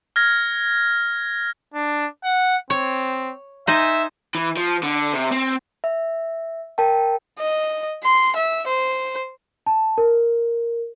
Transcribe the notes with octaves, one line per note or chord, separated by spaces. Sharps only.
F6 G#6 A#6
D4
F#5
C4 C#5
D#4 C5 E5 G#5
E3
F3
D3
C3
C4
E5
A#4 G5 A5
D#5
C6
E5
C5
A5
A#4